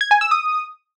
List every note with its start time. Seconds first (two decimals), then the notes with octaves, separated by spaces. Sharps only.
0.01 G#6
0.11 G#5
0.21 E6
0.31 D#6